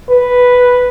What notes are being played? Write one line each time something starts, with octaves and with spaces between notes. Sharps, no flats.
B4